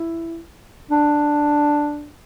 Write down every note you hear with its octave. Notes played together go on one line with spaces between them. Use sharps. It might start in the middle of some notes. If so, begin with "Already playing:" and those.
Already playing: E4
D4